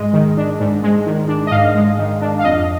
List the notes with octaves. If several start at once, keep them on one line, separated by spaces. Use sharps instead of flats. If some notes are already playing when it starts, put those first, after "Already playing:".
Already playing: G#2 G#3 D#5
D#3
D4
G#2
G#3
D#3
D4
D#5
G#2 F5
G#3
D#3
D4
F5
F2 D#5